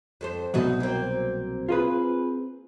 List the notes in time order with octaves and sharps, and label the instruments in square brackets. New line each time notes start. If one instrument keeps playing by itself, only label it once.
[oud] F2 A4 C5
[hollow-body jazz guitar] C2 B2 F#3 [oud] D#4 F#4
[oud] A#3 C4
[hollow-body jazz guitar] F4 G#4 B4